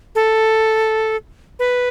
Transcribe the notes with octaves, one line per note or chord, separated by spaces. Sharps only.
A4
B4